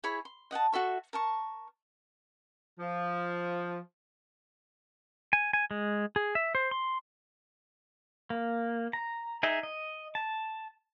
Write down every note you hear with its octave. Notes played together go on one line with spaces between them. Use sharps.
E4 G#4 C#5 B5
C6
D#5 F#5 G5 A5
F#4 A4 E5 C#6
A#4 A5 C#6
F3
G#5
G#5
G#3
G#4
E5
C5
C6
A#3
A#5
D#4 G#4 D#5 E5
D#5
A5